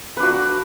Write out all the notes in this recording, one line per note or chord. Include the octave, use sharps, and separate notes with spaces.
D4 F#4 B4